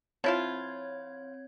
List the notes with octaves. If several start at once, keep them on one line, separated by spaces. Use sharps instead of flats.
F3 C4 E4 F4 C#5 G#6